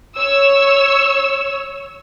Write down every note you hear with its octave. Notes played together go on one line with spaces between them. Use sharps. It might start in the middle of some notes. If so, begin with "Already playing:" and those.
C#5 E6